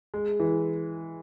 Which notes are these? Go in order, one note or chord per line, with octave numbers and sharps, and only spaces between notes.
G#3
E3